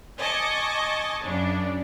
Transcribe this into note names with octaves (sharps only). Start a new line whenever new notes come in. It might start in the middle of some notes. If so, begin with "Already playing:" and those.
D#5 G#5 A5 C#6 D6
F#2 C#3 D4